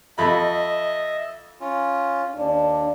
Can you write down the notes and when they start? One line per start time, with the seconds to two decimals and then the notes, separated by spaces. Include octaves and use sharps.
0.18 F2 D#5 E5 B5
1.61 C#4 F4
2.36 D#2 D4